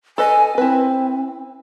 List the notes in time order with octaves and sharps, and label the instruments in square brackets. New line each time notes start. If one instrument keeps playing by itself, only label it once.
[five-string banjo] A4 B4 D#5 [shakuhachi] G#5
[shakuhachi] C4 [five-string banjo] E4 B4